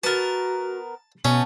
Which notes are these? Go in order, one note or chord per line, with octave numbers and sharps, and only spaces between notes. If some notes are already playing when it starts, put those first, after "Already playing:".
B3 F#4 A#4 A5
B2 A3 B3 C#4